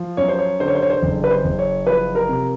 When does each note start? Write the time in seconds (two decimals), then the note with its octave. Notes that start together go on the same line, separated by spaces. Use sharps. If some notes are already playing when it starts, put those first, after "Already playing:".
Already playing: F3
0.17 F#2 C#5
0.29 C5
0.39 C#5
0.60 D3 C5
0.68 C#5
0.75 C5
0.82 C#5
0.90 C5
1.02 F#1
1.24 B4
1.31 C5
1.44 F#1
1.59 C#5
1.87 F3 B4
2.15 A#4
2.29 C3